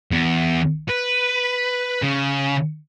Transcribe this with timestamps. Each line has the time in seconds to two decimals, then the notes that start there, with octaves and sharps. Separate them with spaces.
0.11 E2
0.89 B4
2.02 C#3